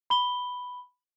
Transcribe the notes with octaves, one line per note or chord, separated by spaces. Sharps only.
B5 G7